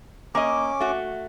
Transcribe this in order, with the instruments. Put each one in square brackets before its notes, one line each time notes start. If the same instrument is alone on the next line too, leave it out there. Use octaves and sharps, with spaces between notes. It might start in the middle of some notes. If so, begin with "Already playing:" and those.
[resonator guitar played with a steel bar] A#3 D#5 [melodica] C#4 D6
[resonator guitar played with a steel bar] A3 F#4